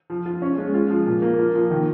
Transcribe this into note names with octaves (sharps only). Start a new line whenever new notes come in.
F3
F4
C#4
G#3
F4
F3
A#2
A#3
F4
F3
D#3